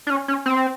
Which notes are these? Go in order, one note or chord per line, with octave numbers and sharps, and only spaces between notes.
D4
C#4
C#4
C4